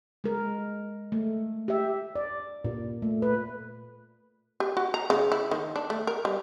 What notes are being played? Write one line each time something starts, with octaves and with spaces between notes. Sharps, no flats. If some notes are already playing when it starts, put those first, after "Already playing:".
G#3 A#4
A3
G4 E5
D5
A#2
A3
B4
G4
F#4
A#5
C#3
E4
D#3
D4
A3
A#4
G3